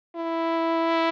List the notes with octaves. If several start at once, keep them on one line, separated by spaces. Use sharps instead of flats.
E4